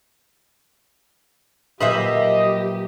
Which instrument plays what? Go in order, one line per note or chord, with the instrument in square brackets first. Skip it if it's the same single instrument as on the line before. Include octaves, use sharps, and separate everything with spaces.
[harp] A#2 F#3 [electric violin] G4 [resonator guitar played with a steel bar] B4 C5 E5 [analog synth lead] D#5